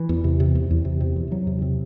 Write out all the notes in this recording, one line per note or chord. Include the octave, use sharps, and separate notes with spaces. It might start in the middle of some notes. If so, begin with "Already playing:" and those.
Already playing: E3
E2
C3
C3
E2
E2
C3
C3
E2
E2 F#3
C3
C3